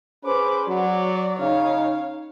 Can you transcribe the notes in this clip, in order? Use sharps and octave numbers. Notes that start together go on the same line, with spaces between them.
C#4 G#4 B4 C5 D6
F#3 D5
C#3 D#4 C#5 F5